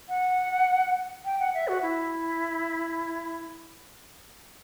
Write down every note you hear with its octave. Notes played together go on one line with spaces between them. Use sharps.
F#5
G5
F#5
E5
F#4
E4